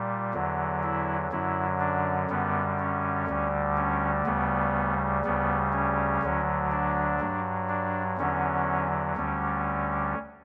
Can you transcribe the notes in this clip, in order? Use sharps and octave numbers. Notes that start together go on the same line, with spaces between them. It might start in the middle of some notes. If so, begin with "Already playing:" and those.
Already playing: A#2 G3
E2 D3 F#3
E4
F#2 D3 F#3 E4
D4
F#2 D3 G3 B3
C#4
D2 D3 G3
C#4
D2 C#3 G3 B3
D2 C#3 G3 B3
C#4
D2 D3 F#3
D4
G2 F#3
D4
E2 D3 F#3 C#4
D2 D3 G3 C#4